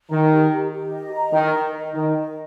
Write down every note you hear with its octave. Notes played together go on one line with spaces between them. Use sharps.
D#3 A#5
G4
G4
G4
D#5
A#5
D#3 G5
A#4
D#5
D#3 G5
D#5